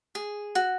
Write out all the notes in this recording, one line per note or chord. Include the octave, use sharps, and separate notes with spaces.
G#4
F#4